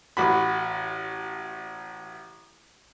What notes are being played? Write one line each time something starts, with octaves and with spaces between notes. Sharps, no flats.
A1 F#4 B5